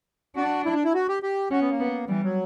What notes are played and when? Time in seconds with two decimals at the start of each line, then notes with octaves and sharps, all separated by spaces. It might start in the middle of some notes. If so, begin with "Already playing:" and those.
0.36 D4 F#4
0.65 E4
0.75 D4
0.84 E4
0.94 F#4
1.08 G4
1.23 G4
1.51 C#4 F#4
1.61 B3
1.70 A#3
1.80 B3
2.09 E3 G3
2.24 F#3